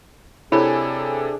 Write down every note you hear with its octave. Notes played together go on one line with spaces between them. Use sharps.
C3 D4 E4 G#4 A4 C#5 G#5 B5